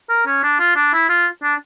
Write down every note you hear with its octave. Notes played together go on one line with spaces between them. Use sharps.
A#4
C#4
D4
F4
D4
E4
F4
D4